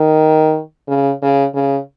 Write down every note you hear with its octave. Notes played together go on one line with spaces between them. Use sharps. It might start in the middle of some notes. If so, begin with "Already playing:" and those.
Already playing: D#3
C#3
C#3
C#3